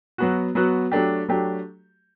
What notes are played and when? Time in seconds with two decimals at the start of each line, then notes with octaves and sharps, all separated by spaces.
0.18 F#3 B3 F#4
0.55 F#3 B3 F#4
0.92 F#3 A3 D4 G4
1.29 F#3 A3 D4 G4